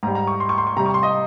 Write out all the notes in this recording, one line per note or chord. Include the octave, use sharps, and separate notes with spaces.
G#2 G3 A#5
A#5
C#6
C6
C#6
C6
C#6
C3 G3 A#5
C#6
C6
D#5